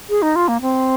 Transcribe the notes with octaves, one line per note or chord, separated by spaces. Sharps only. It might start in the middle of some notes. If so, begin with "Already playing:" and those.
G#4
D#4
F4
A#3
C4